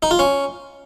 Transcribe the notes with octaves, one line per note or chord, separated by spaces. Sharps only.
D#4
F4
C#4